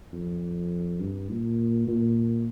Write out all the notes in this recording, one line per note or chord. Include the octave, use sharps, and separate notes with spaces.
F2
G2
A#2
A#2